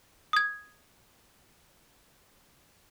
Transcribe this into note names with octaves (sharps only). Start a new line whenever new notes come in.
D#6 G#6